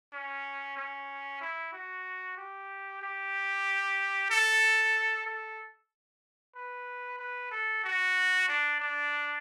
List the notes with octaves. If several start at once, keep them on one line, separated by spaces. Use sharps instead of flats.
C#4
C#4
E4
F#4
G4
G4
A4
A4
B4
B4
A4
F#4
D4
D4